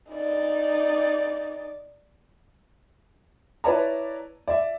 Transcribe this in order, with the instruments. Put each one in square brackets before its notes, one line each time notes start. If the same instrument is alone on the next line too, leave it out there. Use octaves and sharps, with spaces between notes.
[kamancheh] D#4 D5
[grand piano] E4 B4 C#5 D5 A5 A#5
D5 E5